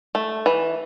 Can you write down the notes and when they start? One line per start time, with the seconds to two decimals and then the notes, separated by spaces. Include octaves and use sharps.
0.15 A3
0.46 E3